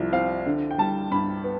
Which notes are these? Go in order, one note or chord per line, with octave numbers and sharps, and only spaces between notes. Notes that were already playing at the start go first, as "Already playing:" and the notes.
Already playing: C2 F3
C4 F5
D3
G5
G3 A5
G2 B5
B3